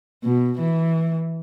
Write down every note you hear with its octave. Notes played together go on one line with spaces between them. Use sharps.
B2
E3